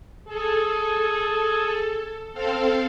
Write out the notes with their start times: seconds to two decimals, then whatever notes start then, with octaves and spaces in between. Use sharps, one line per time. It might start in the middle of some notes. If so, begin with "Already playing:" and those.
0.28 G#4 A4
2.34 C4 A4 F5